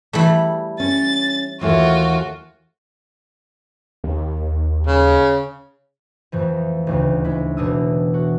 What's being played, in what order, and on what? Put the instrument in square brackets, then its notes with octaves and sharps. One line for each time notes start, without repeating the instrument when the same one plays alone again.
[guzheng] E3 G3 A3
[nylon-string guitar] C#4 [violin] A6
[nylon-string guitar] D#2 E3 A3 [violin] F4 F#4
[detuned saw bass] D#2
[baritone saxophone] C#3
[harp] F2 A2 E3 F3
D#1 D2 C#3
G#3 E4
E1 B2 E3 D4 D#6 E6
F#4